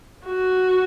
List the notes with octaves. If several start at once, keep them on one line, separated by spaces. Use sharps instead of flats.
F#4